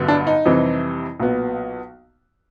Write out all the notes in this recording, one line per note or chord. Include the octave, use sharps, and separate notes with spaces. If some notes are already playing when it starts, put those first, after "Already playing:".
Already playing: A1 G2 D3 F#3 B3
D4
D#4
F2 C3 E3 G3
B1 A#2 F#3 B3